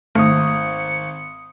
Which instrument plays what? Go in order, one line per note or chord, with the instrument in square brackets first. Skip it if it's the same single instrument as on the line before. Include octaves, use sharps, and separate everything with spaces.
[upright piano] G#1 [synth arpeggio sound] A3 [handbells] D#6 F6 [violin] C#7